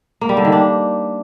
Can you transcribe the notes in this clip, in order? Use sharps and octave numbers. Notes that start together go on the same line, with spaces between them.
A#3
G3
D3
D#3
D4